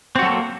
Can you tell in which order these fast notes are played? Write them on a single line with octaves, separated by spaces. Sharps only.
C4 F#4 F#3 A4 A#3